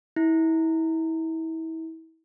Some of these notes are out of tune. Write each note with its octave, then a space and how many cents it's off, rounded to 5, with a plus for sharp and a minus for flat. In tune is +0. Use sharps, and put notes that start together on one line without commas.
E4 -30